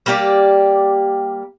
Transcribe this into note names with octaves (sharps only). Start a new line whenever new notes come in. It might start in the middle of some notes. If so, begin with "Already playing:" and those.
G3 A#3 G4 D5